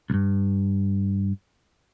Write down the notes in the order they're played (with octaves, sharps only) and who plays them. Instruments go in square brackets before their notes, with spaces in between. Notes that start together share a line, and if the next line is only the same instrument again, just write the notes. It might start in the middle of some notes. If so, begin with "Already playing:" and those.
[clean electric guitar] C2 G2